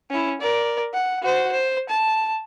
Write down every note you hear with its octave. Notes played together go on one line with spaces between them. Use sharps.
C#4 E4
A#4 D5
F#5
F#4 C5
C5
A5